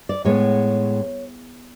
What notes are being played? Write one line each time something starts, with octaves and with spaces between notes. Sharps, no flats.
D5
A2 G#3 B3 C#5